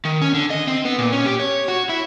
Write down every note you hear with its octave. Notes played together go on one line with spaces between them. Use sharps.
D#3
C#4
D3
D#5
C4
B3
A#2
C#4
G4
C#5
F#4
E4